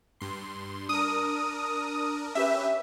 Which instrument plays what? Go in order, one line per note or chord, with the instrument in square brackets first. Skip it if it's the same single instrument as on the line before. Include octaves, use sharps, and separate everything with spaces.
[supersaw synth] G2 C6
[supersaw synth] D4 A#4 [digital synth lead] D#6
[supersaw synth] C#4 G4 B4 [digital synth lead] E5